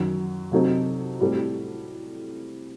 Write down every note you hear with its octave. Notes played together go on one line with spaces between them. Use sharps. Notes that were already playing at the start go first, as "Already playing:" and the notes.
Already playing: F#2 D#3 F#3
C3 F#3 C4 D#4 A4
A2 G3 C4 F#4 A4